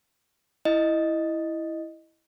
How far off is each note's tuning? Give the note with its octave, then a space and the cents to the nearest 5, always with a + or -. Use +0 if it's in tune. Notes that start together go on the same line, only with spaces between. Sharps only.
E4 +0 D#5 -5